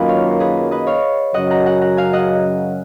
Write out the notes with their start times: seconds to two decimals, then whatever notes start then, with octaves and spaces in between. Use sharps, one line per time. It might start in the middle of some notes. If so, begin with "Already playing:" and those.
Already playing: F#2 D#3 F#3 A#3 F4 B4 D#5 G#5
0.08 C#5 F5
0.40 G#4 B4
0.71 B4 D#5
0.87 C#5 F5
1.34 F#2 C#3 F#3 D#5 F#5
1.50 F#5 A#5
1.65 F#5 A#5
1.81 F#5 A#5
1.97 F5 G#5
2.13 D#5 F#5